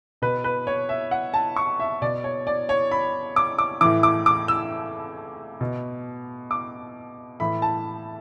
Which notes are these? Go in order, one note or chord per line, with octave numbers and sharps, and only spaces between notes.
B2 B4
B4
C#5
E5
F#5
A5
C#6
E5
B2 D5
C#5
D5
C#5
B5
D6
D6
A2 E3 D6
D6
D6
E6
B2
D6
A2 E3 B5
A5